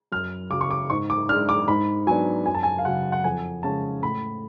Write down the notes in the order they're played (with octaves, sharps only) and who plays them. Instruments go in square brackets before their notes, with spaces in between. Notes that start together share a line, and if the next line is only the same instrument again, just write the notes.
[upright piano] F#2 F6
C#3 F#3 D6
C#6
D6
G#2 C#6
D6
D4 F6
G#3
D6
G#2 B5
F#3 B3 D4 G#5
F#2 G#5
A5
G#5
F5
C#3 F#3 F#5
F#5
F2 G#5
C#3 G#3 C#4 A5
A2 B5